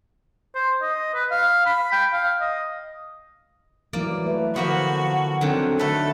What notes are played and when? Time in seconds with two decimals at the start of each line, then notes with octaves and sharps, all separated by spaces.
0.55 C5
0.82 D#5
1.14 B4
1.31 F5
1.66 B5
1.92 G5
2.13 F5
2.41 D#5
3.93 E3 F#3 G3 A#3 E4 D5
4.26 A3 B4
4.56 D3 F3 A#3 B3 F#4
5.41 D3 D#3 F#3 C4
5.79 D3 A3 A4 B4